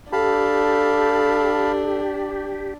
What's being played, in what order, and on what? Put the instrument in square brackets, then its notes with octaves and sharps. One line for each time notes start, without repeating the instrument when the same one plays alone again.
[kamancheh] D4 [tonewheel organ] G4 [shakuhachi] A4 [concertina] F5 A5 B5